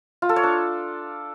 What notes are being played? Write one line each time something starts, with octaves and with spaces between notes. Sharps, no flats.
F4
A4
C#5
D4